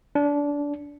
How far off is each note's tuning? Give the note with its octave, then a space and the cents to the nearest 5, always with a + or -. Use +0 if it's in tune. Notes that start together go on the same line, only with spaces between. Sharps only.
D4 -25